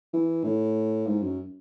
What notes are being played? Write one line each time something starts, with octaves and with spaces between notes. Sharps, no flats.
E3
A2
G#2
F#2